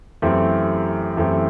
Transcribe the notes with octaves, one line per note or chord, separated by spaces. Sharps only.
F#2 E3 A3 C4 G4
F#2 E3 A3 C4 G4